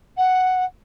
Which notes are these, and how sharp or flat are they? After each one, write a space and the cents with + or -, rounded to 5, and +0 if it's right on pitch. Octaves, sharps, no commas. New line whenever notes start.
F#5 +0